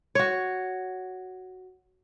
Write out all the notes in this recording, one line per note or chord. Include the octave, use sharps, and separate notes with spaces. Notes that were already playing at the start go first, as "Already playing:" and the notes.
F#4 C#5